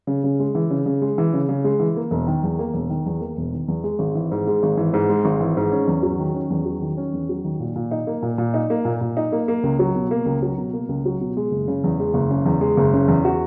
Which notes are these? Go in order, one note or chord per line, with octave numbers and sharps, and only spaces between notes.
C#3
C#3
G#3
E3
C#3
C#3
G#3
E3
C#3
C#3
G#3
E3
A#3
E1
D#3
E2
A#3
E1
D#3
E2
A#3
E1
D#3
E2
G#3
G#1
E3
G#2
G#3
G#1
E3
G#2
G#3
G#1
E3
G#2
C#4
E2
F#3
D#3
C#4
E2
F#3
D#3
C#4
E2
F#3
D#3
A#2
A#2
D#4
A#3
A#2
A#2
D#4
A#3
A#2
A#2
D#4
A#3
A#3
C#2
F#3
B2
A#3
C#2
F#3
B2
A#3
C#2
F#3
B2
G#3
F#1
C#3
E2
G#3
F#1
C#3
E2
G#3
F#1
C#3
E2
F#4